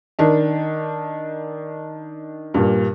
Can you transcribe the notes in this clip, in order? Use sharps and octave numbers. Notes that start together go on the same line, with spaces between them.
D#3 D4
G2 A#2